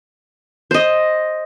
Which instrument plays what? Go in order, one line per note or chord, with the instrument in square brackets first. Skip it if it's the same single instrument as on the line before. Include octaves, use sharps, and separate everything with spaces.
[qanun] C5 D#5